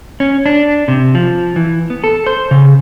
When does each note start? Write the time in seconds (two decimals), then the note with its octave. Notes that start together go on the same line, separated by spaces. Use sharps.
0.20 C#4
0.46 D4
0.88 C3
1.15 F3
1.56 E3
1.90 B3
2.04 A4
2.26 C5
2.51 C#3